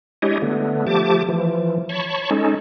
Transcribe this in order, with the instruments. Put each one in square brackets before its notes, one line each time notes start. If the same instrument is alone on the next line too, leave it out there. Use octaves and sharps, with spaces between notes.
[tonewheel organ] G#3 D4 E4 G4 C#5 D#5
D3 A3 B3
F3 A3 G4 A5 D6
E3 F3
C#5 A5 B5 C#6
G#3 C#4 D#4 A4